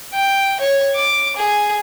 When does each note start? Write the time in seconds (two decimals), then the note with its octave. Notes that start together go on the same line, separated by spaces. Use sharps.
0.14 G5
0.60 C#5
0.95 D6
1.36 G#4